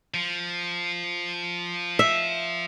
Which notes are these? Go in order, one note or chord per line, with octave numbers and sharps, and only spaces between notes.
F3
E5